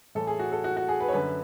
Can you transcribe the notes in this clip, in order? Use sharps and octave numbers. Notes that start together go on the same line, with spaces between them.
A2 E3 A4
G#4
F#4
A4
F#4
F#4
G#4
B4
C#5
F#2 D3 B4